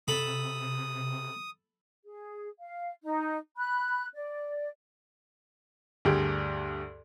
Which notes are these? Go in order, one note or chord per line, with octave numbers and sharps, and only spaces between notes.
C3 A4 B5 D#6
G#4
F5
D#4
B5 F#6
D5
D2 G2 G4 G#4 D7